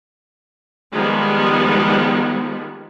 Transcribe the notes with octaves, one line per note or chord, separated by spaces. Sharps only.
D#3 F3 G3 G#3 B3